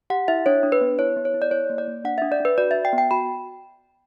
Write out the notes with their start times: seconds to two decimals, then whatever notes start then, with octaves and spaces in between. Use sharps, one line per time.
0.10 G4 F#5
0.28 E4 E5
0.46 D4 C#5
0.63 D4
0.72 B4
0.81 B3
0.99 E4 C#5
1.17 B3
1.25 C#5
1.34 E4
1.42 D5
1.51 E4 C#5
1.70 A#3
1.78 D5
1.88 A#3
2.04 D4 F#5
2.18 D4 E5
2.32 D5
2.40 D4 B4
2.58 F#4 D5
2.71 F#4 E5
2.85 G5
2.93 B3
2.98 G5
3.11 F#4 B5